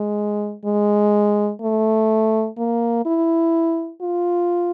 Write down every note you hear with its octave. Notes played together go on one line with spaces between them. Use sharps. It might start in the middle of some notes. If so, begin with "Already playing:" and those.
Already playing: G#3
G#3
A3
A#3
E4
F4